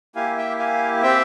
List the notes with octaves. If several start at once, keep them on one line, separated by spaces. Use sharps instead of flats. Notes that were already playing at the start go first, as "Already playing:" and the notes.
A#3 E4 G4 F5 G#5
E5 G5
F5 G#5
C4 G4 E5 G5